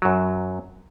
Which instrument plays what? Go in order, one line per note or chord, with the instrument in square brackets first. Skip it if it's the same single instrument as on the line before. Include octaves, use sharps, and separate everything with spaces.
[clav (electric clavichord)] F#2 F#3